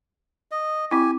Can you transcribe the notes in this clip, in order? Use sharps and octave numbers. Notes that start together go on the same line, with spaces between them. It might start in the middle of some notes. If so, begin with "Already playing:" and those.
D#5
C4 E4 G4 G#5